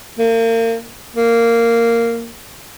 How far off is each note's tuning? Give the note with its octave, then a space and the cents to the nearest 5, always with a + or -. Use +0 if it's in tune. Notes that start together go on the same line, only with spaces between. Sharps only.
A#3 -35
A#3 -10